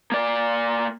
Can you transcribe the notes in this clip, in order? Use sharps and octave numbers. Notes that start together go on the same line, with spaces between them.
A#3 D5